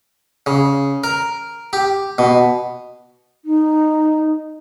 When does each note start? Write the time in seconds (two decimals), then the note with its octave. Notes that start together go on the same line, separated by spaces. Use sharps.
0.46 C#3
1.04 A#4
1.73 G4
2.18 B2
3.45 D#4